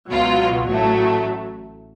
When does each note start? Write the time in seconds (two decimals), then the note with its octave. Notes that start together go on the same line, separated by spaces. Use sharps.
0.10 C#2 B2 F#3 F4
0.67 A1 A2 F#3 A3